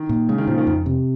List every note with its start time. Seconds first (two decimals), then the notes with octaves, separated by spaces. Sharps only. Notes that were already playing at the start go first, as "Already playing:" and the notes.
Already playing: D#3
0.09 A#2
0.29 C#3 G#3
0.38 D#3
0.47 A#2 F3
0.58 D#3
0.67 F2
0.86 C3